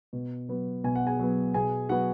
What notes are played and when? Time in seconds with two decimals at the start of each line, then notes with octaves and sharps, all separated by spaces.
0.13 B2
0.49 F#3 B3
0.84 B2 G#5
0.96 F#5
1.06 G#4 G#5
1.19 F#3 B3
1.54 B2 G#4 G#5
1.89 F#3 B3 F#4 F#5